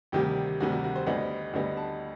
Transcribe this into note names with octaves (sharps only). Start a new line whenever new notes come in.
D2 C3 D#3 G3 G4
D2 C3 D#3 G3 F#4
F#4
F#4
C5
D2 D3 G3 B3 D#4 F#5
D2 D3 G3 B3 D#4
A5